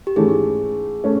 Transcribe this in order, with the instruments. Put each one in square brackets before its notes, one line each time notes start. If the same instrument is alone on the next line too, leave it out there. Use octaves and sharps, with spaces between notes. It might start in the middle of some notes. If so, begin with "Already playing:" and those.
[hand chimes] G4
[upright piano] G#2 E3 A3 C#4 [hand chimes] G#4
[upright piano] A3 C#4